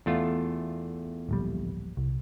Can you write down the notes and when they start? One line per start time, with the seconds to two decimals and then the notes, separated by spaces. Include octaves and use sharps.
0.06 E2 A3 F4
1.29 D1 A#1 G3
1.97 C2